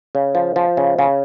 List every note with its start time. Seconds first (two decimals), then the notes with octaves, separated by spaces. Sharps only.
0.15 C#3
0.35 F3
0.56 F3
0.77 C#3
0.99 C#3